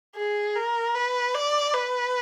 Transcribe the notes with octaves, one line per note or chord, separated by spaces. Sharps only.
G#4
A#4
B4
D5
B4